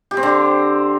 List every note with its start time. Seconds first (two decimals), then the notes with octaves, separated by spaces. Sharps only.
0.11 G4
0.17 C4
0.23 D3